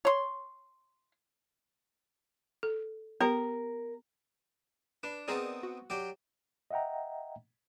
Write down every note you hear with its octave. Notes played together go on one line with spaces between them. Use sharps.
C#5 C6
A4
B3 G4 A#4
D4 B4
B3 C4 D#4 G#4 A#4 D5
F#4
F#3 G4 D5
D#5 E5 F#5 G5 A#5